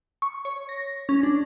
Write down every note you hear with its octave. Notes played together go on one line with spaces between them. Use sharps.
C#6
C#5
A#6
C#4
D4